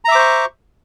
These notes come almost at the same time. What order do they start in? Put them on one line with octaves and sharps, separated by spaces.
A#5 E5 D6 C5 C#6